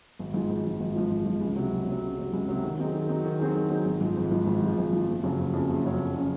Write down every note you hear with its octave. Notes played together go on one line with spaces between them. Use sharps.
G#1
G#2 F3
G#1
G#2 F3
G#1
G#2 F3
G#1
G#2 F3
C#2
C3 F#3
C#2
C3 F#3
C#2
C3 F#3
C#2
C3 F#3
D#3
F#3 C4 D#4 G#4
D#3
F#3 C4 D#4 G#4
D#3
F#3 C4 D#4 G#4
D#3
F#3 C4 D#4 G#4
G#1
G#2 F3
G#1
G#2 F3
G#1
G#2 F3
G#1
G#2 F3
F#1
F2 C#3 F#3 C#4
F#1
F2 C#3 F#3 C#4
F#1
F2 C#3 F#3 C#4
F#1
C#3 F#3 C#4